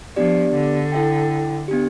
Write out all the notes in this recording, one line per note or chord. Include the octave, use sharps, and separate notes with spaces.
F3 B3 D4 G4 D5
D3
E4 A4 E5 G5
B3 D4 G4